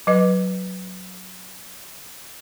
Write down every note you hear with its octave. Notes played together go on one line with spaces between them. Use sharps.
F#3 B4 D#5